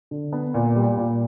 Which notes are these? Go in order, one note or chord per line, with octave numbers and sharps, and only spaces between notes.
D3
B3
A#2
G3
A#2